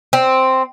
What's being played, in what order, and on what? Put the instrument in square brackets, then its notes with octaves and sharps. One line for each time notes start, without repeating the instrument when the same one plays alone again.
[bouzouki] C4